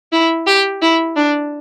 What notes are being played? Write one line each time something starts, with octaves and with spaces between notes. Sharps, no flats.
E4
G4
E4
D4